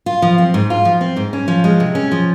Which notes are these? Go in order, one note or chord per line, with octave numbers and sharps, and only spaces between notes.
F4
F3
C4
G#2
F4
F3
C4
G#2
C#4
F3
G#3
C3
C#4
F3